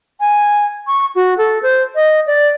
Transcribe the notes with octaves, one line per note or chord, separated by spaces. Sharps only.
G#5
C#6
F#4
A4
C5
D#5
D5